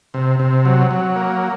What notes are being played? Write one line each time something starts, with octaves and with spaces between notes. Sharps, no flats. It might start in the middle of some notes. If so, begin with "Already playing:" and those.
C3
C3
F#3
F#3
A#3